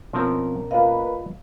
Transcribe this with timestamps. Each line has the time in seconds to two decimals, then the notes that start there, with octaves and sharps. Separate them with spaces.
0.13 B2 F3 C4 C#4 A#4
0.71 A#3 F4 B4 D5 D#5 F5